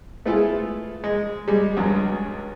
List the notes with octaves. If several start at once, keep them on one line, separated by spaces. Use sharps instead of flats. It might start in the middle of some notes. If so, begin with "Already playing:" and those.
A3 B3 E4 F4 G#4 A4
G#3
G3 G#3
C#2 G2 F#3